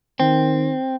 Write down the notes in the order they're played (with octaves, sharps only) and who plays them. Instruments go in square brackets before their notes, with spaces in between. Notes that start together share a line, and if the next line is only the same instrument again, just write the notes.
[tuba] D#3 [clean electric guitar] C4